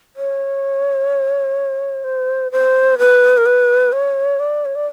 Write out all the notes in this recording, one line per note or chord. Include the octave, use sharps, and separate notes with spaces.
C#5
C5
C5
B4
A#4
B4
C#5
D5
C#5
D5